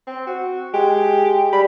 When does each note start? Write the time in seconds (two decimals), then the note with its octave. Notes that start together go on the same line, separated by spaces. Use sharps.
0.07 C4
0.27 F#4
0.74 G#3 G4
1.53 G3 B5